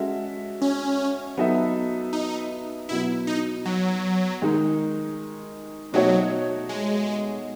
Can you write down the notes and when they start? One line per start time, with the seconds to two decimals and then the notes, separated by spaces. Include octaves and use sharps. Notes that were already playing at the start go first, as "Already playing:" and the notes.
Already playing: G#3 C#4 F#4 A4 E5
0.62 C#4
1.37 F#3 B3 D#4 A4 E5
2.13 D#4
2.89 B2 F#3 B3 E4
3.27 D#4
3.65 F#3
4.42 D#3 G#3 D#4
5.93 B2 F#3 A3 D#4 F#4 C#5
6.69 G#3